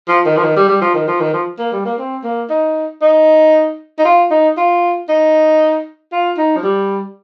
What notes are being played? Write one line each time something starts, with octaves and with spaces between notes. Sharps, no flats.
F3
D#3
F3
D#3
G3
G3
F3
D#3
F3
D#3
F3
A#3
G3
A#3
C4
A#3
D#4
D#4
D#4
F4
D#4
F4
D#4
F4
D#4
F3
G3